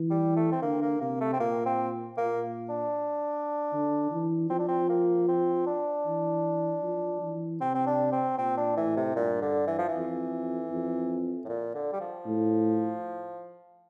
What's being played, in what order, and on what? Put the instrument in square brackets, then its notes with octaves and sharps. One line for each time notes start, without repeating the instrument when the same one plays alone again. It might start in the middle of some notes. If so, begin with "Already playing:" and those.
Already playing: [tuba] E3
[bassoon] G3
A3
C4
[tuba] D3 [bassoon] A#3
[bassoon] A#3
[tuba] C3 [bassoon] A#3
[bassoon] A3
C4
[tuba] A#2 [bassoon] A#3
[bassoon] C4
[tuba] A#2 [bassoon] A#3
[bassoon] D4
[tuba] D3
E3
[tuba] F3 [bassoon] C4
[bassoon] D4
C4
A#3
C4
D4
[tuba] E3
F3
E3
[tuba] C3 [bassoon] C4
[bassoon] C4
D4
C4
[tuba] A#2 [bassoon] C4
[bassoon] D4
[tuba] A2 [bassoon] E3
[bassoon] C3
[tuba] G2 [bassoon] A#2
[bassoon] D3
E3
F3
E3
[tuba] F2
F2
[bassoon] A2
A#2
D3
G3
F3
[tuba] A2